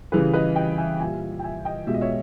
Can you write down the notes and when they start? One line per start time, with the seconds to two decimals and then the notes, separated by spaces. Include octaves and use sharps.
0.12 C#3 E3 G3 G#4 B4
0.33 B4 D#5
0.55 D#5 G5
0.78 E5 G#5
0.99 A#2 G3 E5 G#5
1.39 G5
1.44 E5 G#5
1.65 D#5 G5
1.87 B2 G#3 E5
1.94 D#5
2.01 C#5 E5